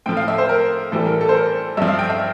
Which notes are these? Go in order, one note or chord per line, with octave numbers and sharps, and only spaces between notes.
A2 F3 G5
F5
E5
C5
A#4
A2 E3 G3 A4
A#4
A4
C5
A#4
G2 F3 E5
F5
G5
E5